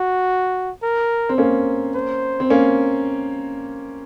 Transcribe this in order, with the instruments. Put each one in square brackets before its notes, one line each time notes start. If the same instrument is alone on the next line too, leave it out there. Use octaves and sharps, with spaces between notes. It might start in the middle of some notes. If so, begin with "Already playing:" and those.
Already playing: [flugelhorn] F#4
A#4
[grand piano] C4
A#3 C#4
[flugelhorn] C5
[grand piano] C4
A#3 C#4